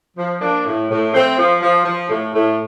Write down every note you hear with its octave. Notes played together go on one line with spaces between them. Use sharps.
F3
F3 A#3 D4
A2
A2
F3 A3 C4
F3
F3
F3
A2
A2